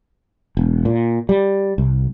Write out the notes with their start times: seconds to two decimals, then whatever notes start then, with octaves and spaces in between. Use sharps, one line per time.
0.57 E1
0.85 A#2
1.29 G3
1.78 C2